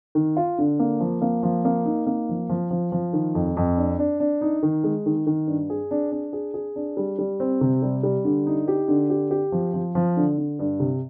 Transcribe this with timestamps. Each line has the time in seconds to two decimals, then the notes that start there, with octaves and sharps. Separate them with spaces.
0.15 D#3
0.37 F4
0.58 D3
0.80 A#3
1.00 F3
1.22 A#3
1.43 F3
1.65 A#3
1.86 D#4
2.07 A#3
2.29 F3
2.49 F3
2.71 F3
2.92 F3
3.13 D#3
3.35 F2
3.57 F2
3.77 D4
3.99 D4
4.20 D4
4.41 D#4
4.63 D#3
4.84 G#3
5.06 D#3
5.27 D#3
5.47 G2
5.70 G#4
5.91 D4
6.12 D4
6.33 G#4
6.54 G#4
6.76 D4
6.97 G3
7.19 G3
7.40 C4
7.61 C3
7.82 G3
8.03 G3
8.25 D3
8.47 D#4
8.68 G4
8.88 D3
9.10 G4
9.31 G4
9.52 F3
9.74 F3
9.95 F3
10.17 D3
10.38 D3
10.59 G2
10.80 C3